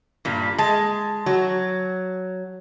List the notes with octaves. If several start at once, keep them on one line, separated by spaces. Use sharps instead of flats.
G2 A#2 G3
G#3 A5
F#3 F#4